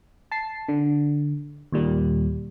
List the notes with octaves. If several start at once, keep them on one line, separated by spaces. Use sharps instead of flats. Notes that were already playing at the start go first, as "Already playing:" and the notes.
A5 C7
D3
D#2 A#2 G3